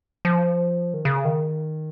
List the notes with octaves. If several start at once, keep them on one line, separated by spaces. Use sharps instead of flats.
F3
D#3
C#3
D#3